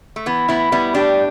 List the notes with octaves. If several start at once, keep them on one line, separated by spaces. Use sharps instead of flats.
A3
E3 B3
A2 B3 E4
G3 B3 E4
A2 D4 G4